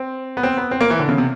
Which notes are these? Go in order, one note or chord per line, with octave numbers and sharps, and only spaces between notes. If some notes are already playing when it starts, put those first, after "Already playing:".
Already playing: C4
B3
C4
B3
C4
A#3
E3
D3
C#3
C3